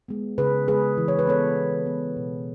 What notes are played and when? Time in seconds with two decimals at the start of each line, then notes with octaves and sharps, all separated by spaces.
0.08 G#3 B3
0.38 C#3 G#4 B4
0.68 G#3 B3 G#4 B4
0.98 E3
1.08 C#5
1.19 B4
1.27 B3 A4 C#5
1.56 E3
1.86 B3
2.16 B2